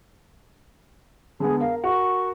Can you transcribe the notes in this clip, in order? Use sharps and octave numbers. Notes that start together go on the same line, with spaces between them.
D3 G#3 B3 G#4
A#4 F5
F#4 A#4 C#6